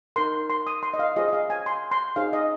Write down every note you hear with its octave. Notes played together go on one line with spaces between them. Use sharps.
D#4 A#4 C6
C6
D#6
C6
D#5
F5
F4 G#4 C5 D#5
D#5
F5
G#5
C6
C6
D#4 G#4 C5 F5
D#5